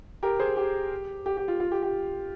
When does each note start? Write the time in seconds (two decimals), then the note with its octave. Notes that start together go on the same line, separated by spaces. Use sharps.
0.23 G4 A#4
0.39 G#4 C5
0.57 G4
1.26 G4
1.37 G4
1.48 F4
1.60 F4
1.71 G4
1.83 G4